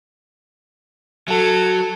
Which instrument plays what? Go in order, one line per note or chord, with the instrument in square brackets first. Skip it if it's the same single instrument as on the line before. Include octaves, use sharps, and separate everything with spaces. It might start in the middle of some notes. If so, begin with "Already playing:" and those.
[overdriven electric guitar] F#3 [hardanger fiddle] A4